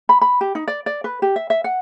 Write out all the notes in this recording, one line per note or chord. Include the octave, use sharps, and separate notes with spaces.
B5
B5
G4
D#4
D5
D5
B4
G4
E5
E5
F#5